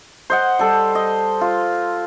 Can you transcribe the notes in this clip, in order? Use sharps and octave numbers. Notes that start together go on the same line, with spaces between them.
C5 D#5 F#5
G3 A4
D#5
F4